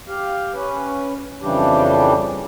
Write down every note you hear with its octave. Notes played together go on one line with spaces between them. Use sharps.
G4 F5
C#4 B4
F2 C#3 E3 G3 D4 G4